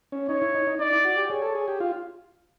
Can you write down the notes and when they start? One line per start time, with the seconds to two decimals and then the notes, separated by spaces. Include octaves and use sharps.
0.12 C#4
0.29 D#4 C#5
0.42 E4
0.55 D#4
0.67 D#4
0.79 D#4 D5
0.93 E4
1.05 F#4
1.17 G4
1.30 G#4 C#5
1.42 A4
1.55 G#4
1.68 G4
1.80 F4